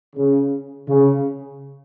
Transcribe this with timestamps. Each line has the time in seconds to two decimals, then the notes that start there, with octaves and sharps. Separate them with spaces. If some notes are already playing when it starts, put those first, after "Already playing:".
0.16 C#3
0.88 C#3